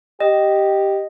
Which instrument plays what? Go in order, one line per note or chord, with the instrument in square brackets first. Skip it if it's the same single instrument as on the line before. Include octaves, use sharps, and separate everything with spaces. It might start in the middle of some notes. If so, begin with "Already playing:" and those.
[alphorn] G4 [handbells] D#5